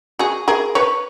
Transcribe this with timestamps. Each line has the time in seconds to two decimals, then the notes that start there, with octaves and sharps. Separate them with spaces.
0.19 F#4 G#4
0.48 G#4 A#4
0.75 B4 C#5